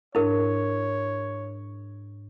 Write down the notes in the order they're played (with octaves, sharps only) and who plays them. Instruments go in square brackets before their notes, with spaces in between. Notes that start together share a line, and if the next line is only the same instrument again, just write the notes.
[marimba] G#2 D4 [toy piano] E4 A#4 [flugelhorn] C#5